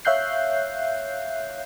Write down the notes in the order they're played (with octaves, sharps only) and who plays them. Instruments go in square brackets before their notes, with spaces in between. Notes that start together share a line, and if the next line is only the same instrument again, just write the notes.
[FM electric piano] C#5 E5 F5 F#6 G6 C7